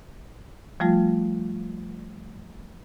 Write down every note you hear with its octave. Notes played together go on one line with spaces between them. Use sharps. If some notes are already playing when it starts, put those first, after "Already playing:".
F3 G3 A3 F4